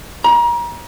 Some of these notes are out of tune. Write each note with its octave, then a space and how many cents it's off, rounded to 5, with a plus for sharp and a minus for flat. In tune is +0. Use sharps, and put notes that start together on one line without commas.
A#5 +30